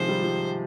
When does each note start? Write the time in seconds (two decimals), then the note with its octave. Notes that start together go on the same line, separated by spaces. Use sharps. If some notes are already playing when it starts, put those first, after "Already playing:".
Already playing: C3 D#3 F3 G#3 C5
0.08 G3
0.24 G3